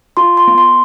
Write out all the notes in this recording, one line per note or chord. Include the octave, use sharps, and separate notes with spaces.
F4 C6
C6
B3
C6